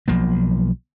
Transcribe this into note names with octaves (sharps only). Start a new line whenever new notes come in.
B1 F3 A#3